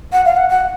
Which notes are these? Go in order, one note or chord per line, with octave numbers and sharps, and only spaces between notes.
F#5
F5
F#5
F#5